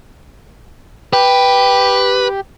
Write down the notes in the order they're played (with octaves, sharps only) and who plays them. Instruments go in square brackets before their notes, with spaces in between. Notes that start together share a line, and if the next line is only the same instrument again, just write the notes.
[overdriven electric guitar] G4 [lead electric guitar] B4